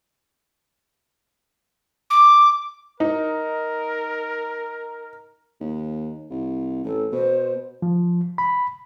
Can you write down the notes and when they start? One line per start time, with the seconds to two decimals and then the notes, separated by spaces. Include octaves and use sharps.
2.10 D6
3.00 D#4 A#4
5.60 D#2
6.30 C2
6.85 A1 A4
7.12 B2 C5
7.82 F3
8.38 B5